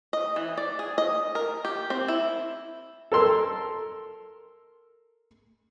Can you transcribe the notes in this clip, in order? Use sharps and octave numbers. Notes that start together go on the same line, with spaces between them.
D#5
E3
D5
G#4
D#5
A#4
G4
C4
E4
A4 A#4 C6 E6